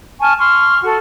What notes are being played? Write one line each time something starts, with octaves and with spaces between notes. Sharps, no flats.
G#5 A5 C#6 F6
C6 C#6 F6
F#4 A4